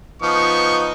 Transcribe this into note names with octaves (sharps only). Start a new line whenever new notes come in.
F3 B3 D#4 C#6